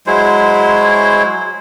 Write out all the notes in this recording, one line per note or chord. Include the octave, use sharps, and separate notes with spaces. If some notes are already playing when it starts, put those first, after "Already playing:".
F#3 G#3 E4 C5